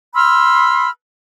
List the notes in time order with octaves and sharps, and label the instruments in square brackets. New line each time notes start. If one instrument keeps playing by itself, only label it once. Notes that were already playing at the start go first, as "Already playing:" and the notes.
[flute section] B5 C6 E6 F6